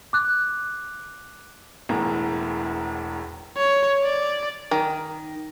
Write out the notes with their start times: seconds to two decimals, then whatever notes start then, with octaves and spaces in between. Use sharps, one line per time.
0.13 D6 F#6
1.89 E1 E2 A2 E3 A#5
3.57 C#5
4.03 D5
4.71 D#3